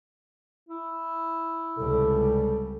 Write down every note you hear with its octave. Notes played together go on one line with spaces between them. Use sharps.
E4
C#2 C3 G3 A4